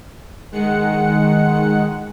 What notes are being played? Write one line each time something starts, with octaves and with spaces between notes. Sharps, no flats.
D#3 G#3 F#5 C#7